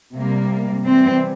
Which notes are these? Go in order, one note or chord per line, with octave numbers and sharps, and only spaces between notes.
C3 G3 A#3
C3 E3 G3 C4